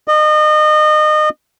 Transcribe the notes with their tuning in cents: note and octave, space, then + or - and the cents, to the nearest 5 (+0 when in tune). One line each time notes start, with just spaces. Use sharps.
D#5 -30